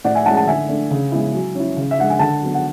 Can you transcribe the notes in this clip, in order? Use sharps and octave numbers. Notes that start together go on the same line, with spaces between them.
A2 D5 F#5
E5 G#5
G#3 C#4 E4 F#5 A5
F#5 A5
D3 E5 G#5
A3 D4
C#3
G#3 B3 E4
F#3
C#4 E4
C#3
E5
G#3 D4 F#5
G#5
D3 F#5 A5
F#3 B3
F#5